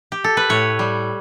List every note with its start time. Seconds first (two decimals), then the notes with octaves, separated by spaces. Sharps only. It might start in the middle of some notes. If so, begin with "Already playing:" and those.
0.12 G4
0.24 A4
0.37 B4
0.49 A2 C#5
0.79 G3